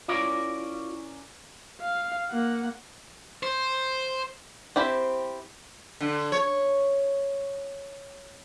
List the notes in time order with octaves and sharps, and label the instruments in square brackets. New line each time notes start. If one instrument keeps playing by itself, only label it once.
[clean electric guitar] C#4 A#4 D5 [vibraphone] E4 [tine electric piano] F4
[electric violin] F5
A#3 F#5
[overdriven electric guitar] C5
[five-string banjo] C4 E4 G4 C5 B5
[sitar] D3
C#5